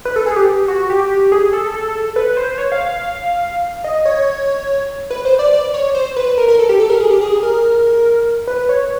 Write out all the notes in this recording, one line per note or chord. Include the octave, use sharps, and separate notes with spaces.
B4
A4
G#4
G4
F#4
G4
G#4
A4
A4
B4
C5
C#5
F5
F5
D#5
C#5
B4
C5
D5
D5
C#5
C5
B4
A#4
A#4
A4
G4
A4
A#4
G#4
G4
G#4
A#4
B4
C#5